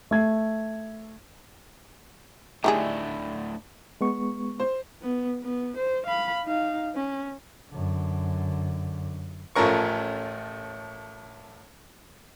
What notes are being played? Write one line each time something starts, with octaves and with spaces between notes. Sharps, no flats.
A3 G#6
D2 A2 D#3 G3 D4 E4 G#4
G#3 B3 C#6
C5
B3
B3
C5
F5 B5
D#4 F5
C#4
F#2 D3
A1 F3 A3 C#4 A#4 C#6